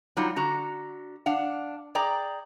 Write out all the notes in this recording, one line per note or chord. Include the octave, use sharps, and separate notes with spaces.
F#3 G3 D#4 F4
D3 F#4 A#5
D4 F5 F#5
G#4 D5 G5 A#5